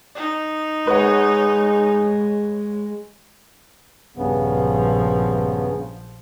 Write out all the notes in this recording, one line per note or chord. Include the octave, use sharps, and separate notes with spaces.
D#4
G#3 B4 C#5 F#5
A#1 G2 C#3 F3 B3